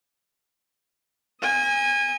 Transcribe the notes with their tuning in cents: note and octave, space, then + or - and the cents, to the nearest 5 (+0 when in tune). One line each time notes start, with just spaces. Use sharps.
D#5 +40 G#5 -25